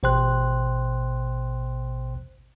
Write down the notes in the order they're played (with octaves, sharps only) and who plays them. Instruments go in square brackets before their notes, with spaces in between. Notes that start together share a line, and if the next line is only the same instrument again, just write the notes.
[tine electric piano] A1 B2 C5 G5 C6 F#6